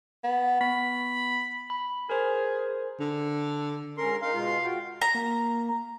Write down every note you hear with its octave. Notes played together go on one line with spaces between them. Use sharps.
B3
B3 B5
B5
G#4 A#4 C5
D3
G#2 C#4 A#4 C6
D#4 A#4 F5 C6
B2 G#3 F4
F4 F#4 G5
A#5
A#3